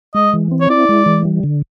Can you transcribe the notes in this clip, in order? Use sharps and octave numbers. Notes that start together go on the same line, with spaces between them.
G#3 D#5
E3
C4
C#5
E4 D5
G#3
E3
G3
D3